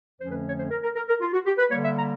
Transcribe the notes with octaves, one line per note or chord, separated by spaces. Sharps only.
F2 D3 F3 A3 C#4 C5
B4
C#5
C5
A#4
A#4
A#4
A#4
F4
F#4
G4
B4
D3 G3 A#3 C#5
E5
A#5